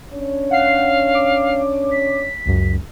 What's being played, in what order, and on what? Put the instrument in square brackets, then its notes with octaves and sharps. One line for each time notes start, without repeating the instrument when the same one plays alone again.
[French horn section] C#4 D4 C#5
[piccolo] F5 [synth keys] F#5 C7
[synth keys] D6
[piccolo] B6
[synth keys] C#2 F#2